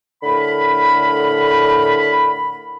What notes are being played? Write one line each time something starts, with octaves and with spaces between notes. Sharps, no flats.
A2 D3 A#4 B5